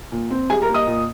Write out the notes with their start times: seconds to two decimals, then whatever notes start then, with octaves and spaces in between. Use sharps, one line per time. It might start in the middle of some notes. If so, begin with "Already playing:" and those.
0.12 A#2
0.31 C4
0.50 G3 G#4 G#5
0.62 A#4 A#5
0.69 A#3
0.74 D#5 D#6
0.87 A#2